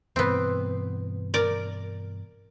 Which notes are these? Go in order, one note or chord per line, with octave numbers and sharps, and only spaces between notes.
G2 B2 E3 B3 C4
A#4 D5